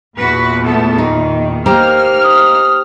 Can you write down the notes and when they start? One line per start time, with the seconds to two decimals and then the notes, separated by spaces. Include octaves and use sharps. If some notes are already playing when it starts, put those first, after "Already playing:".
0.18 E2 A#2 F#4 B4
0.65 A3 B3 A4
0.98 D#3 D#4
1.66 A#3 D#4 G4 C5 A#5 F6
2.24 D#6